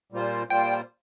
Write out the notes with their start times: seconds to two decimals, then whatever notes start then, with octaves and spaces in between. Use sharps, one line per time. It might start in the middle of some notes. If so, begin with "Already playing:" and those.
0.12 A#2 G3 A#3 F4 C5
0.50 A#2 G3 A#3 F4 C5 G5